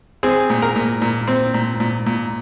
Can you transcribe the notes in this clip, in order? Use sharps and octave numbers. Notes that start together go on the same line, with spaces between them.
C4 G#4
A#2
A#4
A#2
A#2
C4
A#2
A#2
A#2